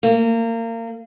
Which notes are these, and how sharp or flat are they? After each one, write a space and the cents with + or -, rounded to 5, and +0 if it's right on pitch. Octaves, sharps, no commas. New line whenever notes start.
A#3 -30